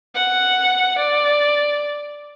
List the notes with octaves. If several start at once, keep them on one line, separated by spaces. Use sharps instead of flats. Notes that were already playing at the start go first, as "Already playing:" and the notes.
F#5
D5